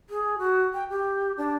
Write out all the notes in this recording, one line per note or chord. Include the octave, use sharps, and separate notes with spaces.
G#4
F#4
G5
G4
D4